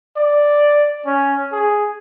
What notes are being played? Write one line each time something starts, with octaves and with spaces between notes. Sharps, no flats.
D5
C#4
G#4